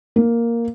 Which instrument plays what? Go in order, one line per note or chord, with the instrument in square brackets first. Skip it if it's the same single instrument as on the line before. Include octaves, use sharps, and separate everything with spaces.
[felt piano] A#3